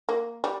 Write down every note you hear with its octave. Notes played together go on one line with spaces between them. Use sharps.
A#3
G3